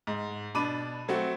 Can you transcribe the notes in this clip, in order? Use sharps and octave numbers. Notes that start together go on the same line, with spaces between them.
G#2
B2 D4 B5 D6 D#7
F#3 A3 C4 F#4